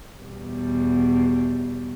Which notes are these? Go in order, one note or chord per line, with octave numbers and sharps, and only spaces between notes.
E2 B2 G3